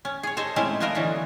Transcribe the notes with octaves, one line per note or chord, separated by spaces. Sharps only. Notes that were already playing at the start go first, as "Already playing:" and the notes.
C#4
G#4 C#5
A4 C5 D#5 G#5
G#3 A3 C4 C#4 E4
A3 B3 F4 A#4 D#5
D3 E3 F#3 C#4